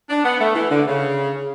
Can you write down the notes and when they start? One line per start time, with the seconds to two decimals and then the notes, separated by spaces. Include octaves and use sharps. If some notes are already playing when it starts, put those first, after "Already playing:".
0.09 D4
0.24 B3
0.40 A3
0.55 E3
0.70 D3
0.87 C#3